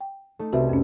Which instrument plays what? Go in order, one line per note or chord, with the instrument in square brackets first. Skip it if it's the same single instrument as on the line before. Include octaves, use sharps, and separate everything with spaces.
[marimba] G5
[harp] A3 D#4
[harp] C2 C4 [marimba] F#4 B4 E5
[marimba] F2 C#4